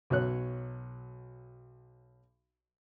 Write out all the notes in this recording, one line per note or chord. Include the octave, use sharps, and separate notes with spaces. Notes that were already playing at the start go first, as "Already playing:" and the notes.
B1 F#3 C#5 F#6